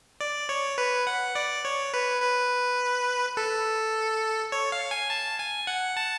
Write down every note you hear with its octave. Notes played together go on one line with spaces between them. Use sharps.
D5
C#5
B4
F#5
D5
C#5
B4
B4
A4
C#5
F5
G#5
A5
G#5
F#5
A5